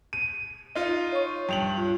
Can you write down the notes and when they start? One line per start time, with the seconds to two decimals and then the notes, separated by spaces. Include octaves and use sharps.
0.13 D#7
0.75 D#4 F4
1.12 C#5 C#6
1.49 G2 G5 F7 F#7
1.78 F4